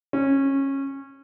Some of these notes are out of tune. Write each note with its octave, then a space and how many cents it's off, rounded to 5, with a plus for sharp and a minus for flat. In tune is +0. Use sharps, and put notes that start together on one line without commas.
C#4 -20